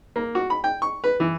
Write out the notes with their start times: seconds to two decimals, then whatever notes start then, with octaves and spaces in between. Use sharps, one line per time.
0.16 A#3
0.35 F#4
0.50 B5
0.64 G5
0.82 C#6
1.04 B4
1.20 E3